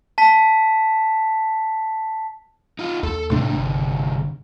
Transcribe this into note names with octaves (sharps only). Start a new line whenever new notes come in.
A5 B6
D#4 F4
D#2 A4
A2 C3 D#3 A3 D4
G1